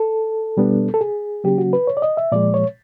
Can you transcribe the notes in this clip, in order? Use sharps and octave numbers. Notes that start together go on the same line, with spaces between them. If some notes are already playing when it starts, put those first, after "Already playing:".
Already playing: A4
B2 G3 B3 D4
A4
G#4
C#3 F#3 A#3 C#4 G4
F#4
B4
C#5
D5
D#5
E5
A#2 F3 G#3 D5
C#5